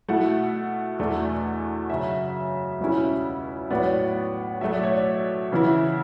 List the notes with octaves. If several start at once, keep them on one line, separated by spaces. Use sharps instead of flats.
B2 A3 E4 F#5
E2 B2 A3 D4
F#2 C#3 F#3 E5
C#2 B2 G3 C#4 E4
A2 F#3 B3 D5
C#5
D5
B2 F#3 A3 E5
D5
C#5
D5
C#3 E3 B3 E4